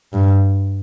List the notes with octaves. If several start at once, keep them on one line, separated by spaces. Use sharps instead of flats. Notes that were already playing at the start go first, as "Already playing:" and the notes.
G2